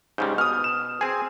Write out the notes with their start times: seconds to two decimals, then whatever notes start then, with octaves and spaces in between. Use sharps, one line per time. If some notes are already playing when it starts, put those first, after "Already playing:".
0.18 G#2 C#3 G3 G6
0.38 B2 D#6 F6
0.64 E7
1.01 C4 G#4 G#5